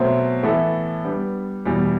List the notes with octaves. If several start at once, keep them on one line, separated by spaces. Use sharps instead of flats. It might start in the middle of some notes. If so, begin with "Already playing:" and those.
Already playing: B2 F#3 A3 C4
A2 E3 B3 E4 A4
G3 B3 D4
E2 B2 G3